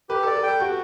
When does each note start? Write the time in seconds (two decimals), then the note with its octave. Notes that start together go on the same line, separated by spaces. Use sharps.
0.09 G4 B4
0.23 A4
0.27 D5
0.35 A4
0.43 G5
0.48 A4
0.60 F#4 G4